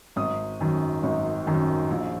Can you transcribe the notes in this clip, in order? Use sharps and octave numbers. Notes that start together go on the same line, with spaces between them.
G#1 D#6
F#2 D#3
G#1
F#2 D#3
A#1